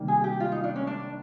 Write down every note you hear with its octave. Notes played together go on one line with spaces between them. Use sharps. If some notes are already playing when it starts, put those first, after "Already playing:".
Already playing: C3 D#3 G3 A#3
G#4
G4
F4
D#4
D4
C#4
D4